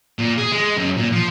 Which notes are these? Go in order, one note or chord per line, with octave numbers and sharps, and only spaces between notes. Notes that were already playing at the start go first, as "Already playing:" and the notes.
A#2
G#4
G#3
F#2
A#2
F3